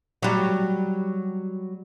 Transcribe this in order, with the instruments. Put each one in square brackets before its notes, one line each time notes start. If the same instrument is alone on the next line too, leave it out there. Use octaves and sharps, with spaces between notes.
[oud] F#3 G3